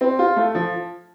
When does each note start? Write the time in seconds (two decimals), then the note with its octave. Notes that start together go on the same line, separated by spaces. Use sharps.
0.01 C4
0.19 F4
0.36 A3
0.55 F3